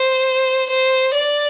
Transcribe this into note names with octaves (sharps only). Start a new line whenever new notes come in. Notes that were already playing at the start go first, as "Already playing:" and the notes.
Already playing: C5
C5
D5